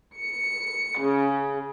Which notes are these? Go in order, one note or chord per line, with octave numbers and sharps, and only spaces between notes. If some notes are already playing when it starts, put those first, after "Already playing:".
C#7
C#3